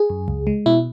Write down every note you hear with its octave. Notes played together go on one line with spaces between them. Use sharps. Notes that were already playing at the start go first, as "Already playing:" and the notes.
Already playing: G#4
F#2
C#2
G#3
B2 E4